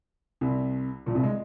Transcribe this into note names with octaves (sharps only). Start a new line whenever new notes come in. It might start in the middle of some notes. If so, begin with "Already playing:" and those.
C2 C3
A#1 A#2
C2 C3
G#3